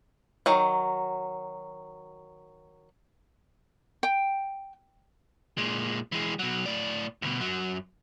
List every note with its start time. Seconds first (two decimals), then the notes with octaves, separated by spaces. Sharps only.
0.46 D#3 F#3
4.03 G5
5.57 A#2 G#3
6.12 E3 G#3
6.39 B2 F#3
6.66 A2 D5
7.22 D2 B2
7.40 F#2 F#3